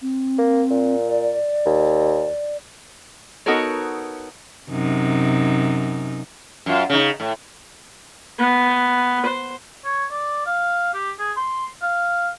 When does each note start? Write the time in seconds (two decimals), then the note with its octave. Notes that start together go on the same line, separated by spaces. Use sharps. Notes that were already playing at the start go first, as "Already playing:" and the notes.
0.02 C4
0.38 A#3
0.70 A#2
1.06 D5
1.66 D#2
3.46 B3 D#4 F#4 A4 A#4 C#5
4.71 F#2 C3 D#4
6.66 F#2 F4
6.90 C#3 D#4
7.20 A2
8.39 B3
9.26 C5
9.85 C#5
10.11 D5
10.46 F5
10.94 G4
11.19 G#4
11.37 C6
11.82 F5